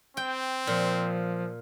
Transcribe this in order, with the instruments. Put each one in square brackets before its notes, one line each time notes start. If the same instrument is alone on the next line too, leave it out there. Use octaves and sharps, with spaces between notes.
[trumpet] C4 [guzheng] G5
[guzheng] A#2 [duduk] F3